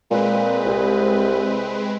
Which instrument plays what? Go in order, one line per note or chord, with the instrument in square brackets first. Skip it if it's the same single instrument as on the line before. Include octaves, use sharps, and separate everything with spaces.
[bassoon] A#2 [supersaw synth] G#3 C4 B4
[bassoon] C2